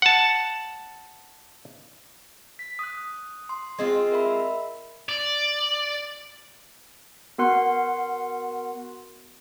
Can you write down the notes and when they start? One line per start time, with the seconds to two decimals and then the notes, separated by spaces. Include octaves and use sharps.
0.02 F#5 A5
2.59 B6
2.79 D#6 F#6
3.49 C6
3.79 G#3 C4 F4
4.12 A#4 E5 B5
5.09 D5
7.38 B3 F#4 A#4 F#5 C6 F#6